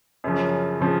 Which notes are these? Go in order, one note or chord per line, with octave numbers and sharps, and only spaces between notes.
F#2 C#3 F3
C#3 F3